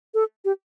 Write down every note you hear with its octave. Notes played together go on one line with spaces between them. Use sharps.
A4
G4